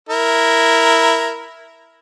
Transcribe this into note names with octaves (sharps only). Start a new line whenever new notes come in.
E4 A#4